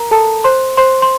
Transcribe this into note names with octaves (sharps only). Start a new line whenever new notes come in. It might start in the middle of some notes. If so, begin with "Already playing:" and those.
Already playing: A#4 A#5
A4 A5
C5 C6
C5 C6
C6